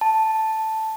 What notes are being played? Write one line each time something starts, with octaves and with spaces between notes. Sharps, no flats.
A5